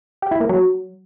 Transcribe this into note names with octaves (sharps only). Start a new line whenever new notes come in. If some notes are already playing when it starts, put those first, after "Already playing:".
G4
E4
A#3
F#3